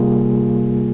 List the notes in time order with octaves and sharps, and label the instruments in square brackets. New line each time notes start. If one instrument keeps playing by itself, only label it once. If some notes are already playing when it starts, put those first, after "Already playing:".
Already playing: [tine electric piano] C3 G3 A#3 F4 G#4